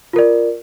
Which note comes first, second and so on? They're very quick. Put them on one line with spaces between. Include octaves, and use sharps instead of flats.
F4 A#4 D5